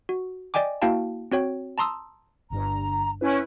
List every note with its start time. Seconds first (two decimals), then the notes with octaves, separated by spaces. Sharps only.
0.09 F#4
0.54 D5 D#5 G5 G#5 D6
0.82 A#3 E4 F#4 F5 G5 A5
1.32 C4 F#4 C#5 G5
1.78 A5 A#5 C6 D#6 E6
2.50 G1 G2 A#5
3.21 C#4 E4 B4